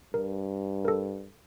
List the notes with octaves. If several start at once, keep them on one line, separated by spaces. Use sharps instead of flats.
G2 A#4
A4 A#4